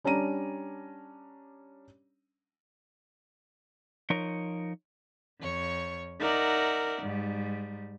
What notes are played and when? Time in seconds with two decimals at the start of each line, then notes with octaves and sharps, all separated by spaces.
0.04 G3 C#4 D4 A#5 D#7
4.10 F3 D#4 A#4 C#5
5.39 F2 C#5 C#6
6.20 D#4 A#4 D5 E5 F#5
7.02 G#2 G3